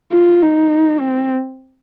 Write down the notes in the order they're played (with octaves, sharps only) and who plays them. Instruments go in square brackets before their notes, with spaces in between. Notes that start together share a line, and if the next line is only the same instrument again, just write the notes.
[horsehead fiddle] F4
D#4
C4